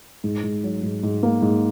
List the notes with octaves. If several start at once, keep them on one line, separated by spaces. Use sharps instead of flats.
G#2
G#2
F#3
G#2
G#2
A#3
G#2